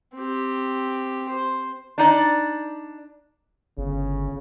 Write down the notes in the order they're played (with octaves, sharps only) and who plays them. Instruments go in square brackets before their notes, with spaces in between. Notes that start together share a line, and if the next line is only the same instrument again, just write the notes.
[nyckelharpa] C4 G4
C5
[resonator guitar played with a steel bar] D4 D#4 D5
[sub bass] G1 [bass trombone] C#3